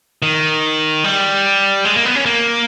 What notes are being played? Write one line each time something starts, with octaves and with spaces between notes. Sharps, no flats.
D#3
G3
G#3
A#3
B3
C#4
A#3